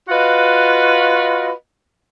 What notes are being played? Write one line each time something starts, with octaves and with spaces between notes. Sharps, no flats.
F4 F#4 B4 D#5 F5